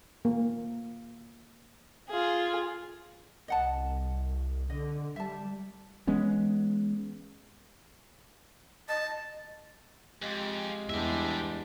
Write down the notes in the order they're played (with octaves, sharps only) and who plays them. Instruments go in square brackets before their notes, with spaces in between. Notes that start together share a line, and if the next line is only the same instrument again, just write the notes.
[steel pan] A#3
[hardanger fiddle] F4 G#4
[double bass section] C2 [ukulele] D#5 F#5 A5
[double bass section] D3 [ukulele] D#5
[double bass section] G3 [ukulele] E5 A5
[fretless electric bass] E3 G#3 B3 C#4
[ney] D#5 [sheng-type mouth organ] A5
[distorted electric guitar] F2 [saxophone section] G#3 [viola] G4
[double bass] E2 [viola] G3 D4 [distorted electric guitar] G4 E5